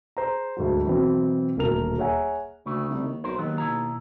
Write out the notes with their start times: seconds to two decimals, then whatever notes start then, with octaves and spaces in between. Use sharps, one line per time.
0.17 G#4 C5 A#5
0.57 D2 G#2 F#3
0.86 B2 E3 F#3 B3 C4
1.57 D#1 D2 B2 A#4 F7
1.98 G#4 C#5 E5 F#5 G#5 A#5
2.66 D2 C#3 A3
2.89 C2
3.03 D#2
3.24 B1 A#4 C5
3.38 D#2 D#3 F#3 B3
3.58 B2 E4 A#5